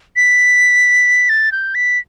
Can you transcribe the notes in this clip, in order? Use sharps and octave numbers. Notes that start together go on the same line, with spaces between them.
B6
A6
G6
B6